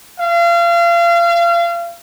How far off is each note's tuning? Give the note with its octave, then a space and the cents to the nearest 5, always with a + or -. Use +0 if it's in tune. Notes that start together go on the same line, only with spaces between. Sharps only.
F5 -35